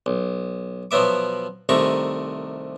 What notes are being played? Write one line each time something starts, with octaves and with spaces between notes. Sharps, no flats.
B1
B2 F3 F#3 B3 E5 D6
C2 C3 D#3 A3 A#5 C#6